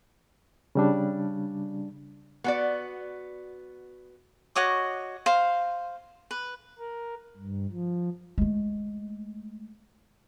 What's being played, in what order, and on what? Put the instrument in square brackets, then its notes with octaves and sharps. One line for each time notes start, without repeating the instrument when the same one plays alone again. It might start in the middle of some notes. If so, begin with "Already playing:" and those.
[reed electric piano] C#3 G3 D4
[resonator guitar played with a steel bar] B3 F#4 D5
[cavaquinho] F#4 C#5 D#5 D6
C5 F5
B4
[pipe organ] A#4
G2
F3
[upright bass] G#3 A3